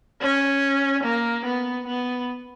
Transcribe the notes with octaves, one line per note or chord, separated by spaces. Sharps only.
C#4
A#3
B3
B3